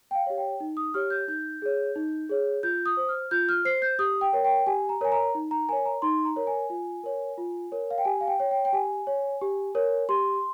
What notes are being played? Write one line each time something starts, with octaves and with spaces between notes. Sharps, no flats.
G5
F5
G4 C#5
G5
D#4
D#6
G4 C#5 F6
G6
D#4 G6
G#4 C#5
D#4
G#4 C#5
F4 G6
D#6
C5
F6
F4 G6
F6
C5 C7
G6
G4 D#6
G5
A#4 C#5
G5
G4 G#5
A#5
A#4 C#5 G#5
A#5
D#4
A#5
A#4 C#5 G#5
A#5
D#4 C6
A#5
A#4 C#5
G#5
F4
A#4 C#5
F4
A#4 C#5
F5
G5
G4 G#5
F5
G5
C#5
G5
G5
G4 G#5
C#5
G4
A#4 C#5
G4 C6